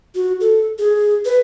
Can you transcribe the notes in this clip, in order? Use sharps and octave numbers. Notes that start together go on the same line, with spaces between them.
F#4
A4
G#4
B4